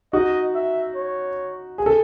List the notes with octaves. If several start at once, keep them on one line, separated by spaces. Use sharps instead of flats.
D#4 F#4 D#5
E5
C#5
G#4
A4